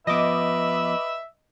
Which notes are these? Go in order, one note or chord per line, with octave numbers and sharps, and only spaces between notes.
F3 B3 B4 D#5 E5 D6